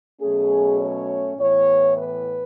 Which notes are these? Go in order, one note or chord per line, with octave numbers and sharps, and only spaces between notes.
B2 F#3 A3 C#4 G#4
C#5
A2 E3 B3 C#5
B4